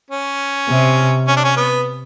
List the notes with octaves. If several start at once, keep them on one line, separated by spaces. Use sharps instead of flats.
C#4
C3
C#4
D4
C#4
B3